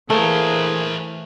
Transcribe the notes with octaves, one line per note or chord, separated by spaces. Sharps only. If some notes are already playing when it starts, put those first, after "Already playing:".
E3 A3 A#3 G#4 A#4 C5